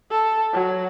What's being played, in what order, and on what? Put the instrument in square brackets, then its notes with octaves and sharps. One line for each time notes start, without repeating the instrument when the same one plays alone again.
[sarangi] A4
F#3